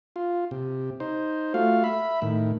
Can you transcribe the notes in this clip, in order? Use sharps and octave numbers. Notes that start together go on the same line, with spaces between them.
F4
C3
D#4 C5
A3 F4 F#4 F5
E5 B5
A2 D#3